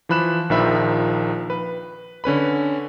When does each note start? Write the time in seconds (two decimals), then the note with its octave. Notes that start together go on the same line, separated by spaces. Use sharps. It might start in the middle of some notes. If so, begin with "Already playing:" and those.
0.09 E3 F3 B5 F#6 E7
0.50 A#1 D#3 F3 E5 B5
1.50 B4
2.24 D3 C#4 B4 B5